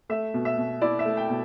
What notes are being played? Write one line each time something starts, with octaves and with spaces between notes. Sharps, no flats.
A3 E5
B2
E5
B2
E4 D5
E5
A3
G5
B2